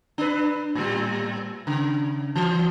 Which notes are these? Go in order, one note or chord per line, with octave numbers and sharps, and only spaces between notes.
D4 B4
A2 G3
C#3
E3